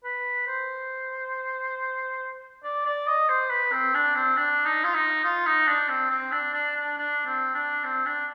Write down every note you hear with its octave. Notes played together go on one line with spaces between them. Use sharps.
B4
C5
D5
D5
D#5
C5
B4
C4
D4
C4
D4
D#4
F4
D#4
F4
D#4
D4
C4
C4
D4
D4
D4
D4
C4
D4
C4
D4